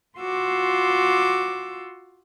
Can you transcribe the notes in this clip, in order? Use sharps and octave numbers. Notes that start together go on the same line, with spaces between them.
F4 F#4 C6 D6 E6